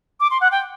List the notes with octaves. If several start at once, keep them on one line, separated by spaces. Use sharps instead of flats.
D6
C6
F#5
G5